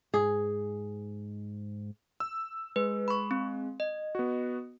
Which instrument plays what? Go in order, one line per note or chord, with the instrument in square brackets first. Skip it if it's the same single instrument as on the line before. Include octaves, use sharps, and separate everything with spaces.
[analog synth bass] G#2 [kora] G#4
[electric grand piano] E6
[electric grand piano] G#3 [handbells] B4
[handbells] B5 C#6
C4
D#5
[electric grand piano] B3 F#4